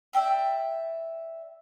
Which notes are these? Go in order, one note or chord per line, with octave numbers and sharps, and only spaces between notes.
D5 E5 G5 B5